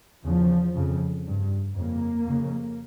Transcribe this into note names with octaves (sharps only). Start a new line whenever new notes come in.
E2 C#3 F3
F2 C#3
G2
F2 C#3 A#3
F2 C#3